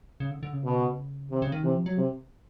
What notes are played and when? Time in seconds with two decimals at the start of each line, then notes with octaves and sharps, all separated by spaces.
0.20 C#3
0.31 D3
0.43 D3
0.53 C#3
0.65 B2
1.31 C3 D#3
1.42 C#3
1.52 D#3
1.63 C3 E3
1.75 F3
1.86 F#3
1.97 C3